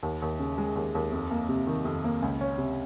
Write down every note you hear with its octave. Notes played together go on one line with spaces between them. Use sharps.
D#2
D#2
C#3
G#3
D#2
D#2
F2
A#3
C3
D#3
F2
A#3
C#2
C#4
C3